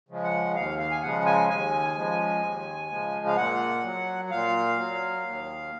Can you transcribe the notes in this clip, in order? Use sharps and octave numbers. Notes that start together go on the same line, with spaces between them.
C#3 F3 G#3
F#5
D#2 F5
F5
G#5
C#3 F3 G#3 F#5
G#5
D#2 G#5
C#3 F3 G#3
D#2
C#3 F3 G#3
F5
A#2 F#5
F#3
A#2 F5
F#3
D#2